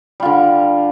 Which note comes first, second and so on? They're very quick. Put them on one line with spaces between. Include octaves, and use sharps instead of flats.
G3 F4 D3